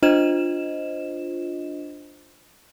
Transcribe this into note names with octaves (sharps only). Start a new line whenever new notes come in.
D4 F4 C5 D#5 E7